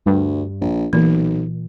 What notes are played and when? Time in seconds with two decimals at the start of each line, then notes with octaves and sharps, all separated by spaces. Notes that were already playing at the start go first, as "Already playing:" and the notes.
0.06 D2 G2
0.61 A#1
0.93 B1 A#2 E3